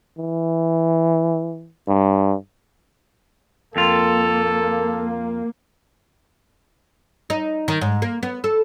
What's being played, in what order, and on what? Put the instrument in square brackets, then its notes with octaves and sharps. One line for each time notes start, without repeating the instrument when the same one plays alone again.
[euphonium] E3
G2
[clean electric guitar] F2 F4 [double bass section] A#3 [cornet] A4
[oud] D#4
D#3
G#2
A#3
B3
A4